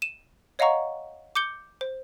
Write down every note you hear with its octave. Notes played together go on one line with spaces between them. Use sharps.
D#7 E7
C#5 D#5 F5 F#5 A#5 C#6
D6 G6 C#7 G7
C5